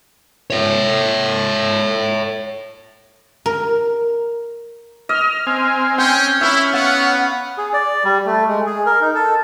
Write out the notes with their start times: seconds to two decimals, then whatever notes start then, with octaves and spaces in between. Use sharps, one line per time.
0.50 C#5 E5
3.46 A#4
5.09 D#5 F6
5.47 C4 G#5
5.98 C#4 G5 G6
6.41 C#4 E4 E5 B5 F6
6.73 B3 F5 F#5
7.58 G#4
7.73 D5
8.05 G3
8.26 A3
8.48 G#3
8.66 G#4
8.86 A#4
9.01 D#4
9.15 A4